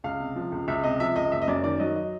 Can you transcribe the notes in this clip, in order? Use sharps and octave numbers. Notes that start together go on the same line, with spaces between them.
C#2 F5
C3
F3
C#2
C#2 E5
C3 D#5
F3 E5
C#2 D#5
F#1 E5
D#5
F#2 D5
D#3 D5
F#3 D#5
D#5